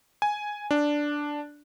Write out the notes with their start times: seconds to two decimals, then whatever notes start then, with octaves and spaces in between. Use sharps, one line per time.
0.22 G#5
0.71 D4